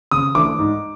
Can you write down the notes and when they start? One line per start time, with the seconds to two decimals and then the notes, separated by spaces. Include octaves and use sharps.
0.11 C#3 D#6
0.35 E3 A3 D4 D6
0.59 G#2